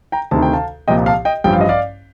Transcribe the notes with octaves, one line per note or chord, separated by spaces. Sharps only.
G5 A#5
D2 C3 D#3 A5
G5
F5 A5
C2 A#2 F3 D#5 G5
F5 A5
D#5 G5
A1 G2 F3 G5
F5
D#5
D5 F5